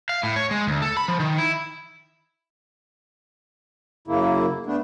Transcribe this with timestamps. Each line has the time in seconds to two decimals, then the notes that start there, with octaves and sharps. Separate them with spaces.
0.09 F5
0.23 A2
0.36 C#5
0.51 G#3
0.67 D2
0.82 A4
0.97 B5
1.08 F3
1.20 D#3
1.38 E4
4.08 F#2 C#3 A#3 E4
4.66 A3 B3 D4